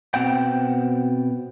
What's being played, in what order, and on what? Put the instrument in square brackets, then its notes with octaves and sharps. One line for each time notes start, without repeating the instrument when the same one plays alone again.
[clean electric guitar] B2 C4 F#5 G5